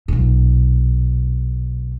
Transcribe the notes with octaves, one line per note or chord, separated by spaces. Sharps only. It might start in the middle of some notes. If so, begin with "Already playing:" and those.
B1 A#2